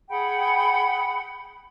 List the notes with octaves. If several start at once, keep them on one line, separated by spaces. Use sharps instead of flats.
G#4 F#5 G5 B5